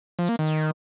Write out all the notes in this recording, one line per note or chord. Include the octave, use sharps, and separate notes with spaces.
F3
A#3
D#3